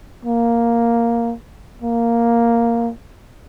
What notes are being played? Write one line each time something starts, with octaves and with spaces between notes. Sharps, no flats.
A#3
A#3